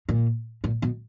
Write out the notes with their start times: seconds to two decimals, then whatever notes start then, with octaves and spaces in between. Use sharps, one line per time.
0.09 A#2
0.64 A#2
0.82 B2